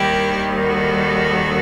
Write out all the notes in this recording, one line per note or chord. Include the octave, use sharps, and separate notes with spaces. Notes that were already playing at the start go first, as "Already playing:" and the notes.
Already playing: D#2 D#3 G3 E4 G4
F#4 A4